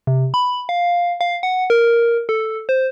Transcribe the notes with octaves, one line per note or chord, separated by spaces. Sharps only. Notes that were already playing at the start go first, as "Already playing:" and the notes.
C3
B5
F5
F5
F#5
A#4
A4
C5